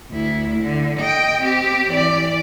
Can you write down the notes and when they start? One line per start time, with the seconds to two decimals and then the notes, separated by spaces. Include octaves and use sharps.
0.10 D2 E4
0.61 D3
1.00 D#5 G5
1.43 C4 G4
1.91 E3 D5